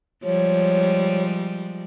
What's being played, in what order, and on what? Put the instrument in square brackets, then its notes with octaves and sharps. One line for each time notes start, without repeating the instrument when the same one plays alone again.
[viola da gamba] F3 G3 G#3 [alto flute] C#5